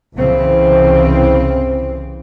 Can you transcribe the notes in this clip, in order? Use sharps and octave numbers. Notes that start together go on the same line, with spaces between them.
C2 C#3 E3 C4